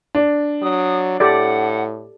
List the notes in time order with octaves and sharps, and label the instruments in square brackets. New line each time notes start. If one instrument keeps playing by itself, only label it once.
[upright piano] D4
[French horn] F#3 [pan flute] D#6
[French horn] A2 [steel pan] G4 A4 D5 [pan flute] F#5